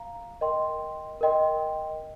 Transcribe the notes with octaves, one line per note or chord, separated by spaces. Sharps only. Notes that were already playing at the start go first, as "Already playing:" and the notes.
Already playing: F5 A#5
A#4 D#5 G5 C6
A#4 D#5 G5 C6